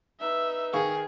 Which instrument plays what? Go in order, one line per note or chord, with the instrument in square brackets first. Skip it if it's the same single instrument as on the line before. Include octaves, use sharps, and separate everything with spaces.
[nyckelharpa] D#4 B4 [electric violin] E5
[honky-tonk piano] D#3 F5 C#6 [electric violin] G#4